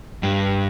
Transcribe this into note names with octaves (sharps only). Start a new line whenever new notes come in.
G2